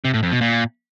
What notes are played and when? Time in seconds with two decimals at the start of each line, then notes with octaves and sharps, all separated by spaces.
0.05 C3
0.14 A2
0.23 F2
0.32 B2
0.41 A#2